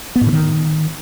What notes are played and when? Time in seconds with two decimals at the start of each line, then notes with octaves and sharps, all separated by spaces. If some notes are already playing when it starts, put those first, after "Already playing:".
0.16 B3
0.21 A2
0.27 D3
0.32 D#3